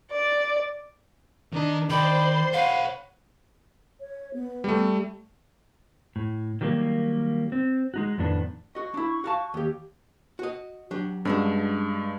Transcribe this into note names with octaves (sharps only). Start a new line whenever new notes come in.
D5
D#3 D4 D#4 A#5
D#3 C5 D5 G5 B5 C6
C5 C#5 F5 F#5 B5
C#5
B3
G3 A3
A2
D#3 F#3 G3 A#3
C4
G#3 D#4 F#4
F2 A2 D#3 B3 D4
F#4 D#5 C#6
D4 E4
F#4 F5 A5
D#2 G4
F#4 D#5
F#3 D4 G4
G2 G#3 C#4 D4 F#4